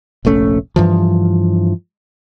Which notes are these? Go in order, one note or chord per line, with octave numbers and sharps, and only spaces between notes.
F1 A#1 A3 C#4
G2 E3 F3